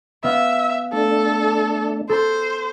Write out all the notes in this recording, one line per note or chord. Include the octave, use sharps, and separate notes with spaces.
B3 E5 F5
A3 D4 A4
A4 C5